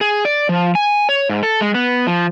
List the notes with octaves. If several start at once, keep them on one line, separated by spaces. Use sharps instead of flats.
G#4
D5
F3
G#5
C#5
G#2
A4
G#3
B3
F3